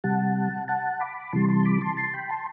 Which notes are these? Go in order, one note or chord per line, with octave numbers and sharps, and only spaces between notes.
C3 G3 F#5 A5
F#5 A5
B5 D6
C3 E3 G3 A5 C6
A5 C6
B5 D6
A5 C6
A5 C6
G5 B5
A5 C6